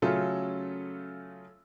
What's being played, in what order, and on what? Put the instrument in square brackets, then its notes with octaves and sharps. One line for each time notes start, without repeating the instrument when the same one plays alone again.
[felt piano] C#3 F#3 A3 C#4 F4 A4